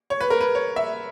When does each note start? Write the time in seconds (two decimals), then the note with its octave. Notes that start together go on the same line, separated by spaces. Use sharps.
0.10 C#5
0.21 B4
0.30 A#4
0.41 B4
0.55 C#5
0.76 E5